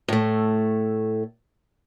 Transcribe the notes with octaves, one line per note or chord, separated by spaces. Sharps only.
A2 A3